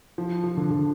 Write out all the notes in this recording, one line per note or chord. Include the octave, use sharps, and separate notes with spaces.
F3
F3
D3
D3